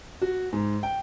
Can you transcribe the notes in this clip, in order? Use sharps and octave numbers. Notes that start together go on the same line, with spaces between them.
F#4
G#2
G5